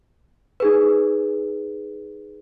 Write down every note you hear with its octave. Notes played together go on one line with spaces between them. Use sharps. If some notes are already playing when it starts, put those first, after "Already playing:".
D#4 G#4 B4